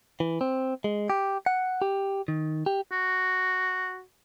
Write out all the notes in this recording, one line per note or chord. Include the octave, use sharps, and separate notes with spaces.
E3
C4
G#3
G4
F#5
G4
D#3
G4
F#4